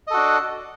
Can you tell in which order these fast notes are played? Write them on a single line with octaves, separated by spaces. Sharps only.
D#5 A4 F#4 D4